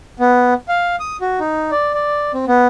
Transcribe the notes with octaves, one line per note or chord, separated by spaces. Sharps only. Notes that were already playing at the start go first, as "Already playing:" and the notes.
B3
F5
D#6
F#4
D#4
D5
D5
C4
B3